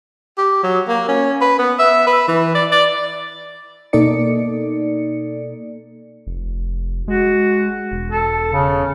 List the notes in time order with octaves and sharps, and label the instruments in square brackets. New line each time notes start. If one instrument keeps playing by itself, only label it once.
[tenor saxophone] G4
F#3
A#3
C#4
B4
B3
E5
B4
E3
D5
D5
[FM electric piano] B2 A#3 D#4 A4 D5 C#7
[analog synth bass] F1
[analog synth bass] G#3 [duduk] F#4
[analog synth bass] E1
[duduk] A4
C#3